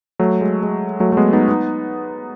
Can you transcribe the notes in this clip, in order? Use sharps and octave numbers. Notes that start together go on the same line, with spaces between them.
F#3 A3
G#3
G#3
F#3 A3
A3
G#3 B3
B3 D#4
B3 D#4